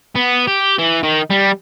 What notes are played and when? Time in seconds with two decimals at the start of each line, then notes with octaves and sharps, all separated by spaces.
0.15 B3
0.47 G4
0.79 E3
1.03 D#3
1.30 G3